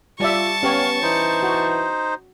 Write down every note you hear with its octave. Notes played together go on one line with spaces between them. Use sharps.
G3 F4 D5 E5 A5 C#6
B3 C#4 G4 C#5 F5
E3 D#4 C5
F#4